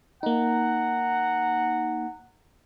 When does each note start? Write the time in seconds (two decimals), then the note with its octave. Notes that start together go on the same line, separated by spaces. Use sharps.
0.23 A#3 D#4 F#5 A#5